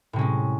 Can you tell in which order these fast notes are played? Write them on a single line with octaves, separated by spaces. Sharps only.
A2 C3 C#4 G#3